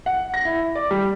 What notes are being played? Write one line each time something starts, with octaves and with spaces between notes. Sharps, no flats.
F#5
A#6
E4
D5
G3